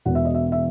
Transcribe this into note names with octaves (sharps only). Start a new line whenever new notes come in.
E1 E2 B2 F#5
E5
D#5
E5
E5